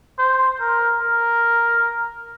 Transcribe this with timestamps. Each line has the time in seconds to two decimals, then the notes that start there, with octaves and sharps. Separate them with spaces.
0.19 C5
0.60 A#4
1.01 A#4